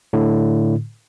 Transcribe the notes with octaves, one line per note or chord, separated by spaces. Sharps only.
A2 D3